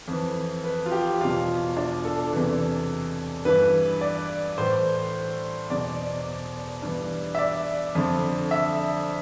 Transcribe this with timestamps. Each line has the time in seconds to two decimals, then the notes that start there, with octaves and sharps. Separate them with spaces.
0.08 F2 E3
0.64 B4
0.86 F4
0.92 G4
1.20 E2 B2 F4
1.77 D4
2.05 A4
2.33 E2 C3 E3
3.45 G2 E3 B4
4.01 D5
4.58 A2 E3 C5
5.70 E2 B2 D5
6.82 G2 E3
7.35 E5
7.38 D5
7.95 F2 D3
8.51 E5